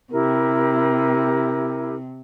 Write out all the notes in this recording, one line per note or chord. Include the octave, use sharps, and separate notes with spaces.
C3 E4 G4 A#4